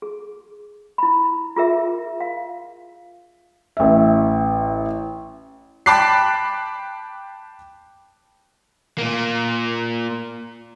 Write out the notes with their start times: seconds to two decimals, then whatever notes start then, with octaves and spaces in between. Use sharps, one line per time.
0.02 G#4
0.98 E4 B5
1.56 F4 G#4 A#4 E5
2.21 F5
3.77 A1 E5
5.86 G5 A5 B5 D6 F#6 C7
8.98 A#2 A#3